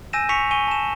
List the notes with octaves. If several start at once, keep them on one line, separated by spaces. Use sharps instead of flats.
G#5 E6 G6 A#6 D#7 E7
G#5 C#6 B6 C#7 F7
G#5 C#6 D#7 G7
A5 E7